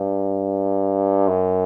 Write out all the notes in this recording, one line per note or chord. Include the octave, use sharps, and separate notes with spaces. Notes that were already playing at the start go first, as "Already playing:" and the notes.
Already playing: G2
F#2